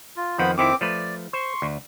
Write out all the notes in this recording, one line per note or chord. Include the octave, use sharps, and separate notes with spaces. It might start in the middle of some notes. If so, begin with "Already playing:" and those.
F4
F2 D#3 F3 B3 C5 B5
F2 D#3 C4 E4 D6
F3 A3 B4 D5
C5 C6 C#6
D2